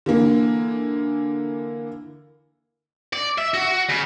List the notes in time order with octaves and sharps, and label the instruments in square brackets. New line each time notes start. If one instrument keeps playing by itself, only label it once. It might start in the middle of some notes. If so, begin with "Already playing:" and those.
[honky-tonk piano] D3 E3 A#3
[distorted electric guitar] D5
E5
F#4
C#3